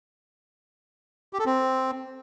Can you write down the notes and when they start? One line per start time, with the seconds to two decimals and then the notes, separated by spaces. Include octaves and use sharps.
1.33 G4
1.39 A4
1.46 C4